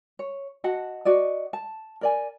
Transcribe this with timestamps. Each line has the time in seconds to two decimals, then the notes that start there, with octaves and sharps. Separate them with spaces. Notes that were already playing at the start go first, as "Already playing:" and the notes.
0.19 C#5
0.64 F#4 D#5 F#5 A5
1.05 F#4 D5 D#5
1.53 A5
2.01 A#4 D5 G#5